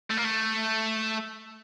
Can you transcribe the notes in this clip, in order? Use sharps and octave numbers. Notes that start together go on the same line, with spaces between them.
A3
A#3
A3